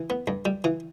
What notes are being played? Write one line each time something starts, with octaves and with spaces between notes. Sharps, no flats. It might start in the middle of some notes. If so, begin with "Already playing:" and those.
Already playing: E3
B3
G2
G3
E3